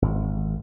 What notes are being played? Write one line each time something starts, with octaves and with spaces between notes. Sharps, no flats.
G#1